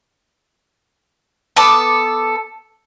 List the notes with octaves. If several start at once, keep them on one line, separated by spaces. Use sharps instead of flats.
B3 A4 A5 D6